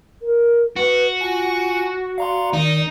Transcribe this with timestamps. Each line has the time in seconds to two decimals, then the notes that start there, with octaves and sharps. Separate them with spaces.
0.21 A#4
0.76 F#4 B4
1.21 F4 G#5
2.18 D5 F5 A#5 C6
2.53 D#3 D#4